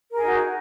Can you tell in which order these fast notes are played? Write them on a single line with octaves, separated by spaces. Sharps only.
A#4 G#4 D#4 F#4